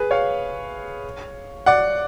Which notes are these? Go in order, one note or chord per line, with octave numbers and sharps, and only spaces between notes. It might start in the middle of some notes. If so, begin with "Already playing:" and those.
Already playing: G#4 B4
C#5 F5
D5 F#5